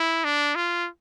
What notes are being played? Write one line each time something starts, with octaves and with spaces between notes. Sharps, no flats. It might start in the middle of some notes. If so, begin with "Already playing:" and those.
Already playing: E4
D4
F4